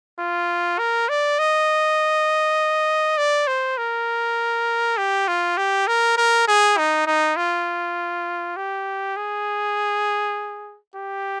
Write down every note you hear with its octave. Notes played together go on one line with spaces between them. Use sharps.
F4
A#4
D5
D#5
D5
C5
A#4
G4
F4
G4
A#4
A#4
G#4
D#4
D#4
F4
G4
G#4
G4